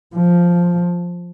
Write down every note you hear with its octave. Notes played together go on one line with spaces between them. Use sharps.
F3